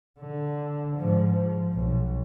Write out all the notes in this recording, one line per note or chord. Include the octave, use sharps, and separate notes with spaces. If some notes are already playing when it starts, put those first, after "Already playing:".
D3
G#2 F3
F3
B1